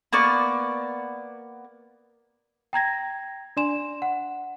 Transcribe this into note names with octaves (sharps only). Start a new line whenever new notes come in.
A#3 B3 D5 C#6
G5 A#5 G#6 A#6
D4 D5 G#5 C6 E7
F#5